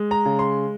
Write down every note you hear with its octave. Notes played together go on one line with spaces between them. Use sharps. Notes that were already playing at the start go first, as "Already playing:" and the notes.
Already playing: G#3
A#5
C#3
C6